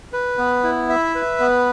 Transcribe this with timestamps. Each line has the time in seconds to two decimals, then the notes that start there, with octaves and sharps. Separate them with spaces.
0.13 B4
0.38 B3
0.64 E4
0.89 E5
1.15 B4
1.40 B3